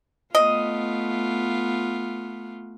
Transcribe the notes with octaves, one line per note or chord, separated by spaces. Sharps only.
A3 B3 F4 D#5